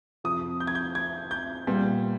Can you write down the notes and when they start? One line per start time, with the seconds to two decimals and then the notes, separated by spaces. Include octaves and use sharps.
0.24 F2 C3 F3 D#6
0.60 G6
0.67 G#6
0.75 G6
0.95 G#6
1.31 G6
1.67 A#2 G3 B3